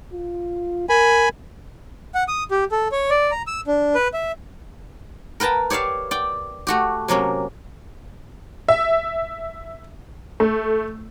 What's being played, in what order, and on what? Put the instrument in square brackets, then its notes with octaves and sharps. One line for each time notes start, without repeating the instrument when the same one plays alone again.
[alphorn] F4
[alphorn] A#4 [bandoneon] G#5 B5
[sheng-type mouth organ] F#5
D#6
G4
A4
C#5
D5
A#5
E6
D4
B4
E5
[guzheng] A#4 B4 G5 A5 A#5
G4 C#5 D5 E5 F5
D5 G5
A3 F#4 G4
C3 F#3 A#3 C#4
[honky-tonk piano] E5
A3